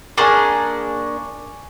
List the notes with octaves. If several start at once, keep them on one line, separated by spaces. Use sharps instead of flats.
A#3 D4 G#4 G#5 C#6 D6